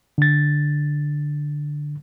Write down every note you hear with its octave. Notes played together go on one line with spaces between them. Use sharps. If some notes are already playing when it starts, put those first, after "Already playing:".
D3 A6